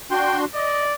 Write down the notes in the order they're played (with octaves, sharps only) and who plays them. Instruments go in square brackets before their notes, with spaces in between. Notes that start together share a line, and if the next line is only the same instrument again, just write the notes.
[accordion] D4 F#4 C6 [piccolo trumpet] G5
[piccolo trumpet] D5 [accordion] D#5